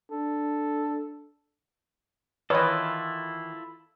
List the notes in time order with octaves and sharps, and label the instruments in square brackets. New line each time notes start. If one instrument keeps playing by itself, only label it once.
[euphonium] D4 [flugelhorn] A4
[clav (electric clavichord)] D#3 E3 [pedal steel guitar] E4 F4 A4 [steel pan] B4 D#5 [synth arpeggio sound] C#5